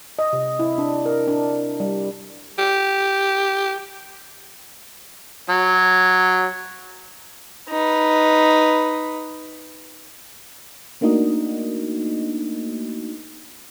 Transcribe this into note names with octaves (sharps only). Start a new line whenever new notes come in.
D#5
C3
E4
D4
A#4
D4
G3
G4
F#3
D#4 B4
A3 A#3 D4 D#4 F#4 D#5